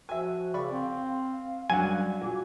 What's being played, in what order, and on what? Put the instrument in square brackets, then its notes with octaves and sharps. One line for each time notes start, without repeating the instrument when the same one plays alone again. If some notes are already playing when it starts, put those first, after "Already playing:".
[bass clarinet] F3 [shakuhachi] F#4 [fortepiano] E5 G#5
[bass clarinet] C#3 [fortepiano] D5 B5 C#6
[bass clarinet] C4 [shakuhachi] F5
[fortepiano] F#2 D4 F#5 [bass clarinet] G3 [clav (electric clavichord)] G#5
[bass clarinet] A#2 [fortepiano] F#3 [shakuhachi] D6